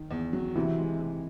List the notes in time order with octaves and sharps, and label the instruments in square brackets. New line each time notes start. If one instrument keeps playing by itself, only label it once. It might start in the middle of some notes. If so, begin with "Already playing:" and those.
Already playing: [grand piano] D#3
[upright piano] E2
F#3
[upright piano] C3 [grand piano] E3
[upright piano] G#3
C3